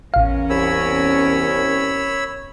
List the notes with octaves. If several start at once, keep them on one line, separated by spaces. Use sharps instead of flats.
A1 E2 C#4 A#4 F5
C2 C#5 B5 E6